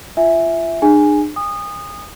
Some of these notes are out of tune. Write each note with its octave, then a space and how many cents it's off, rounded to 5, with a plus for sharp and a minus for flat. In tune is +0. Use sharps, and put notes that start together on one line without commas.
F4 -30 E5 +0 G#5 -5
D4 +45 G#4 -10 G#5 +0
G#5 -40 D#6 -20